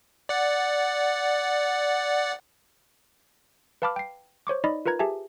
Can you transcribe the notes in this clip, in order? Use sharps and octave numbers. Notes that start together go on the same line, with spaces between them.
D5 F#5
B4 F5 A5 B5 D6 F6
G5 C7
C5 C#5 C#6 D6
D#4 D5 D#5 B5
F4 A#4 B4 A#5 G#6
G4 G#4 E5 G#5 A5